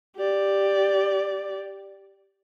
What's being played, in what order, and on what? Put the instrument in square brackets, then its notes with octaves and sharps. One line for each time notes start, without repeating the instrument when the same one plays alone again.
[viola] G4 D5